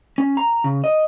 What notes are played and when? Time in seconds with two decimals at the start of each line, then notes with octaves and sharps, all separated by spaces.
0.18 C#4
0.37 A#5
0.64 C#3
0.84 D#5